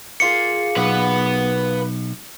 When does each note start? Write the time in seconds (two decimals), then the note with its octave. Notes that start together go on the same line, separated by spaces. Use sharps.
0.20 A#3 F4 G#4 C#7
0.76 B1 B4 F#5